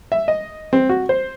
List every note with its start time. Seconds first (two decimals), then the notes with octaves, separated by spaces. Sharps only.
0.12 E5
0.28 D#5
0.73 C4
0.89 F#4
1.09 C5